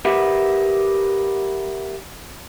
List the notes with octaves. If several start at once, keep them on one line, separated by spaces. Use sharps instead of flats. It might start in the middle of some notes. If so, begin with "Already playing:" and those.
G4 A#4 B4 E5 F#5